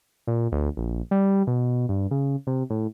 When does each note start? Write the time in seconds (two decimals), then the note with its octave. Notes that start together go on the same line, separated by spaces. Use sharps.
0.27 A#2
0.52 D2
0.77 A#1
1.11 G3
1.47 B2
1.89 G2
2.11 C#3
2.47 C3
2.70 A2